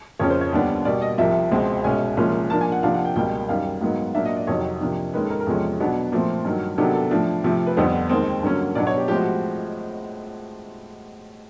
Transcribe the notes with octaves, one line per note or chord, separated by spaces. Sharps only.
F2 C#3 F3 A#3 C#4 C#5
C5
C#5
D#2 D3 G3 B3 D4
B2 G3 A#3 D5
D#5
C2 C3 F3 E5
C#2 B2 G#3 C4
C2 B2 G#3 C#4 G#5
C2 A#2 F3 G#3 C#4
A#2 F3 A#3 D4 A5
G#5
F#5
C3 F3 A#3 D4 F5
F#5
G5
C#2 B2 G3 A#3 G5
F#2 D#3 G3 F5
G#2 D#3 F#3 B3
A#2 F#3 A#3 D4 E5
D#5
D5
F2 C3 D#3 F#3 C#5
C3 F3 A#3 D4
D#2 D#3 G#3 C#4 B4
A4
A#4
A#4
E2 C3 F3 G#3 C#4 A4
B2 F#3 B3 D4
A#2 F3 A3 C4
G2 D#3 F#3
C3 D#3 F#3 B3 D4 A4
A4
A2 F3 A3 D4
C3 F3 A3
B4
F2 D3 G3 B3 D4 C5
D#2 D#3 G#3 C4
G2 D3 F#3 A#3 C#4
B2 F#3 B3 D4 D5
C#5
G4
A2 F3 G#3 C4 G4
F#4